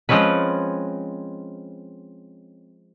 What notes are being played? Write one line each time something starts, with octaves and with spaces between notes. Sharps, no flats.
F3 G#3 C4 C#4 B4